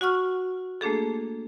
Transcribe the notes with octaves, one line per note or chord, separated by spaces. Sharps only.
F#4 F#5 C#6 F6
A3 A#3 D4 G#4 A4